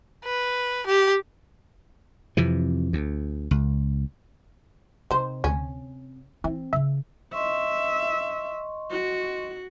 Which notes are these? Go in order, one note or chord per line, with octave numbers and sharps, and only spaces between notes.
B4
G4
F2 C3 E3
D2
C#2
C3 D#3 C5
D2 C#4
E3 C4
C#3 E3 E5
D#5 E5 C6 C#6
F#4